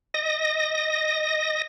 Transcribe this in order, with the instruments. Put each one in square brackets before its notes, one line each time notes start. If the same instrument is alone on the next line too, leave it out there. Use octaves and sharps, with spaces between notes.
[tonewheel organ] D#5 A#6